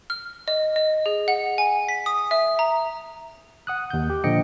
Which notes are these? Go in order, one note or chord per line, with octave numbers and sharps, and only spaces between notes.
F6
D#5
D#5
G#4
F#5
G#5
B6
D#6
E5
A#5
F#5 D#6 F#6
D#2 G6
G4
A#2 D3 F3 D#5 G5 C#7